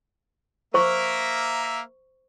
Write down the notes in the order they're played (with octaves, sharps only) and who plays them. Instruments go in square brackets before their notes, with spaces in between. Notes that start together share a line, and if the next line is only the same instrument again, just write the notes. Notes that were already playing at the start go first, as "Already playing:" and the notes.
[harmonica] A#3 A#4 E5 [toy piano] C5 C#6